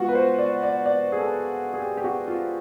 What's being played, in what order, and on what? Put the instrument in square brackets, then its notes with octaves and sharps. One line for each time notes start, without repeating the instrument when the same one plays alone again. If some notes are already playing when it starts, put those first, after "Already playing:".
Already playing: [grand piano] G#3 B3 F4 F#4
B4
C5
D5
D5
D5
G#4
A4
G#4
G4
G4
F#4
F4